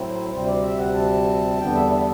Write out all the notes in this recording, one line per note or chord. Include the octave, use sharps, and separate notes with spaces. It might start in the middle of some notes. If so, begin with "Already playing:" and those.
Already playing: A2 F#3 C4 E4 C5
D2 C3 G3 C4 C5
D5
E5
F#5
A5
E2 D3 G3 B3 D4 G5
E5
E5